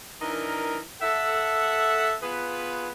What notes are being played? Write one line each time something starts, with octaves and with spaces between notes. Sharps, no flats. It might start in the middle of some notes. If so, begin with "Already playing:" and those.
E3 D4 D#4 A#4
A4 E5 F#5
B3 F4 G#4 B4